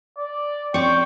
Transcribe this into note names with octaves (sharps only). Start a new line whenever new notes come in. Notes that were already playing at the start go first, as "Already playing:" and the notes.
D5
C4 D5 G5 C#6